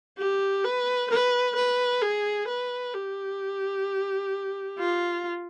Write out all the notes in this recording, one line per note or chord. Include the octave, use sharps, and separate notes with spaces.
G4
B4
B4
B4
G#4
B4
G4
F4